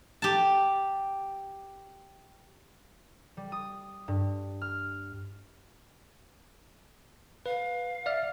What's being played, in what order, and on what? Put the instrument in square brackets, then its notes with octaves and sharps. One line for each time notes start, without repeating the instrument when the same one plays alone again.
[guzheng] G4 A5
[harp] G3
D#6
G2
F6
[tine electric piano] B4 [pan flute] F5
[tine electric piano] D5 E5 F6